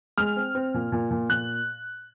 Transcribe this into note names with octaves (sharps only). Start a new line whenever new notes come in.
G#3 F6
C4
C4
A#2
A#2
A#2
A#2 F#6